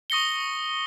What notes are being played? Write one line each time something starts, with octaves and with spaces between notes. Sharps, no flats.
C#6 D#6 A#6 C#7 G7